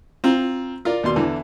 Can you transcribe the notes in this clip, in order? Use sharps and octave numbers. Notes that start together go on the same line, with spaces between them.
C4 F4 A#5
F4 A#4 D5
D#2 B2 D5 C6
E2 D3 E3